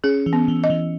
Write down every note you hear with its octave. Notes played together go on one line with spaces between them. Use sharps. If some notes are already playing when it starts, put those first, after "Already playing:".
C#4 G#4
E3
B3
E3
D#5
E3